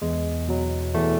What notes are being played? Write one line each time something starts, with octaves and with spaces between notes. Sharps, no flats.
E2 G#3
B2 F#3
E2 A3